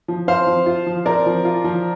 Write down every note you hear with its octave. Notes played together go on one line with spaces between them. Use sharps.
F3
C4 C5 F5
F3
F4
F3
C4 A#4 D5
F3
F4
F3